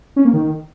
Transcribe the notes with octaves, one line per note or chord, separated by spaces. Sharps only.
C#4
A#3
D#3